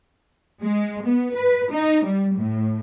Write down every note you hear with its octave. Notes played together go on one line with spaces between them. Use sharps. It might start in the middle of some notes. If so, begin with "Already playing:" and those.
G#3
B3
B4
D#4
G3
A2